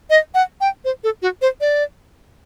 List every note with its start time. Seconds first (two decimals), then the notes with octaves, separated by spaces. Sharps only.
0.10 D#5
0.34 F#5
0.61 G5
0.85 C5
1.04 A4
1.22 F#4
1.42 C5
1.61 D5